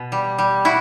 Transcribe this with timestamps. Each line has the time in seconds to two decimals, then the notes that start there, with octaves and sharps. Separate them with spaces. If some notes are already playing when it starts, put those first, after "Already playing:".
Already playing: B2
0.12 G3
0.38 G3
0.65 E4 F#4